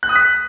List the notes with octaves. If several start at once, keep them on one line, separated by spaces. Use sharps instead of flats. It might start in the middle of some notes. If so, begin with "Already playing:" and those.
F#6
D#6
B6